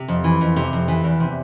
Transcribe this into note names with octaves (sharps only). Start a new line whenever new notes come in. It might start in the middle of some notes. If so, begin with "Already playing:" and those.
Already playing: C3
F2
E3
F2
C3
F2
E3
E2
C3